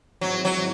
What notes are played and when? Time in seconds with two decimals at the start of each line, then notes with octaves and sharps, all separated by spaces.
0.21 G#2 D#3 F#3 G#3 C4 E4
0.45 F#3